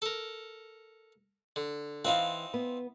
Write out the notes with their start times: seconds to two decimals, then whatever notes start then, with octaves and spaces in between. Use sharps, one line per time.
0.02 A4 A#4
1.56 D3
2.05 E3 C4 D#4 F4 F5 F#5
2.54 B3